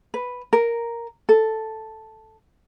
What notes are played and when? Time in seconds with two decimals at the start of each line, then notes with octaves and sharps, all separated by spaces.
0.14 B4
0.53 A#4
1.29 A4